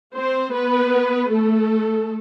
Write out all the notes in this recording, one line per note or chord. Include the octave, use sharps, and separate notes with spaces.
C4 C5
B3 B4
A3 A4